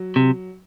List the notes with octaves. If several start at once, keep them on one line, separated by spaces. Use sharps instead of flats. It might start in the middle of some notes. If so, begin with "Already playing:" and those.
Already playing: F#3
C3